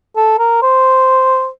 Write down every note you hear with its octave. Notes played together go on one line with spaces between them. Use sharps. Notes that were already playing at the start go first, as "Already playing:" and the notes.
A4
A#4
C5